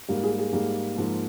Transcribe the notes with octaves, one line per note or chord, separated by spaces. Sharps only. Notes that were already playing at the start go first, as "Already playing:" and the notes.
G#2 G3 A#3
G#4
G#4
G#2 G3 A#3
G#2 F3 A#3